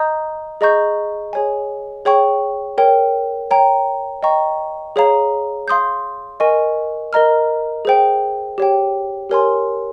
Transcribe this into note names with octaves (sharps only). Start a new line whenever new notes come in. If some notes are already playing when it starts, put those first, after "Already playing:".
Already playing: D#5 A#5 D#6 G6
G#4 D#5 A#5 C#6 G6
G#4 C#5 G#5
G#4 C#5 G5 C#6
A#4 C#5 G5
C#5 G5 A#5
D#5 G5 A#5 C#6
G#4 C#5 F5 A#5
F5 C6 D#6 G6
A#4 D#5 G#5 C#6
A#4 D#5 A#5 F6
G#4 C5 G5
G4 C#5 G5
G4 A#4 C#5 G#5 C6